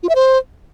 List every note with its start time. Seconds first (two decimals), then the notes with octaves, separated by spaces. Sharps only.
0.03 F4
0.09 E5
0.15 C5